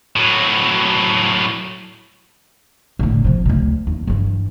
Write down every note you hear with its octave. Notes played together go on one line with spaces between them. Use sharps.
A2 F#3
A2 D3
C3 F3
D2 D3
D#2
G2 E3